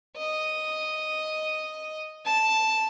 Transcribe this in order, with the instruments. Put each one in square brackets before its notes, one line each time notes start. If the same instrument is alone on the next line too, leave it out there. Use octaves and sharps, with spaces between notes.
[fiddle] D#5
A5